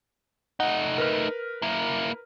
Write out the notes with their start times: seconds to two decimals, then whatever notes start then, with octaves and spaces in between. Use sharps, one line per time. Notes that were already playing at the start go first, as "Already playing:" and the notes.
0.60 A3 D#4 F#5
0.98 A#4 B4 F6
1.62 A#3 E4